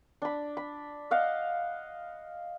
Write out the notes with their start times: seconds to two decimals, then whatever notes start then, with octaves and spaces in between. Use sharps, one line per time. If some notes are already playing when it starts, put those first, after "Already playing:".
0.22 D4 B5
0.57 B5
1.11 D#5 F5 F#5